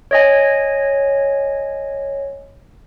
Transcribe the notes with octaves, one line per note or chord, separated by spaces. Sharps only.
C#5 D#5 G#5